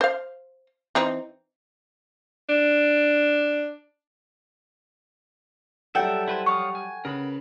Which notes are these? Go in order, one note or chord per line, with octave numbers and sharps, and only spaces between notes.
C5 F5
E3 C4 D#4
D4
F#3 G3 A4 E5 F#5 G5
E4 B4 C5
C#5 F5 C#6 D#6
G#5
C#3 A#4 B4 B5